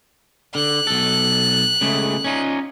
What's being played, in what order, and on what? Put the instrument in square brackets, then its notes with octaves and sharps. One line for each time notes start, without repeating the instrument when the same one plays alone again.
[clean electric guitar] D3 [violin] F#6
[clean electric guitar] B1 A4
C#3 G#3 A3
C#4 D#4 F4